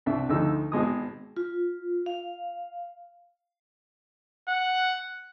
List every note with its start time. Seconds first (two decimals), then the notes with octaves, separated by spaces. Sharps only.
0.06 C2 D4 E5
0.29 D2 D3 F3 D#4 E6
0.72 G#1 B2 G#3 D#6
1.36 F4
2.06 F5
4.48 F#5